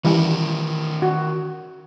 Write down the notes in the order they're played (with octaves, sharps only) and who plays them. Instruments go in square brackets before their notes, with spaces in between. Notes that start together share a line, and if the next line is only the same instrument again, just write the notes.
[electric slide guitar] D#3 C#4 A#4 [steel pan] E3 G3
[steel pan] F#4